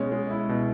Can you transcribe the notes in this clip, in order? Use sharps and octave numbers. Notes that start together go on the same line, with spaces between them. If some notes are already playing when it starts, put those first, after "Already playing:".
Already playing: B2 G#3 C#4
G#3
E4
B2